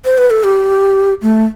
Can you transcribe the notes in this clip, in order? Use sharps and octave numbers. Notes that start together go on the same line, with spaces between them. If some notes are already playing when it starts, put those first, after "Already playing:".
C5
B4
A4
G4
A3